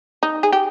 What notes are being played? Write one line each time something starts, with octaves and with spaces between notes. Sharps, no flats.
D#4
G#4
G4